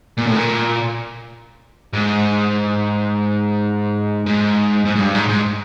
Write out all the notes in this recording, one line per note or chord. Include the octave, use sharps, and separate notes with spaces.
A#2
A2
A#2
G#2
G#2
G#2
G#2
G2
G#2
G#2